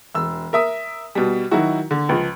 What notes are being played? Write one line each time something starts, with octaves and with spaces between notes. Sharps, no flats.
E1 E6
A#4 E5 D#6
B2 G3
D#3 F#3 D#4 E4 F#4
D3
C#2 F3